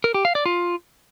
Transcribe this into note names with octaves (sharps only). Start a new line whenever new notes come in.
A#4
G4
F5
D5
F4